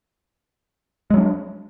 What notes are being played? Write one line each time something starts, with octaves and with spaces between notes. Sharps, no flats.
F#3 G#3 C#4 D4